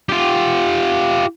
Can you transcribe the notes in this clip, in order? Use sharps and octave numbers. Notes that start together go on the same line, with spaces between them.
F4 G4